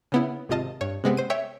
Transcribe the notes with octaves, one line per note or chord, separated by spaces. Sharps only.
C#3 B3 E4
G#1 C3 F4 D#5 A5
G2 C#5
C3 G#3 B3 C4
C5 D#7
C#5 E5 G5